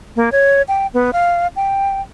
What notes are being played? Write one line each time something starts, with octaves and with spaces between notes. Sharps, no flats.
A#3
C#5
G5
B3
F5
G5